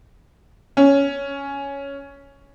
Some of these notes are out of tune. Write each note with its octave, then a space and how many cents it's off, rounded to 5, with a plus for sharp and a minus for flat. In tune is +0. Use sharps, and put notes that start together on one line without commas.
C#4 +5